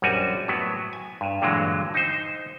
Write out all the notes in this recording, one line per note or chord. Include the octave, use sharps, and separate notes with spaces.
A#1 F#2 G3 F#4 G#5
A2 F#3 B3
G#5
G2
G2 A#2 D3 E3 F#3 G#3
D#4 C5